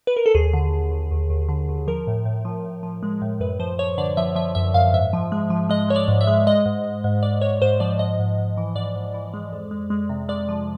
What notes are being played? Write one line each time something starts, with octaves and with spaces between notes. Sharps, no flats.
B4
A#4
A4
D#2 G#4
D3
D3
D#2
D#2
D#2
D3
D#2
F3 A#4
A2
A2
F3
A2
F3
G#3
A2
F#2 B4
F3 C5
F3 C#5
D3 D5
F3 E5
F3 E5
F#2 E5
F#2 F5
G#2 E5
F3
G#3
F3
G#3 D#5
G#3 C#5
D5
G#2
E5
G#3
G#3 D#5
G#2
G#2
G#2
G#2 D5
G#2 C#5
G#2 C5
F3 D5
G#2 D#5
G#2
G#2
E3
G#2 D5
G#2
E3
G#3
F2
G#3
G#3
C3
G#3 D5
F3